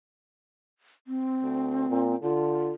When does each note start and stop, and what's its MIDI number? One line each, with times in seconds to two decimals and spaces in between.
1.07 2.16 60
1.43 1.87 38
1.89 2.15 46
2.23 2.73 50
2.23 2.70 65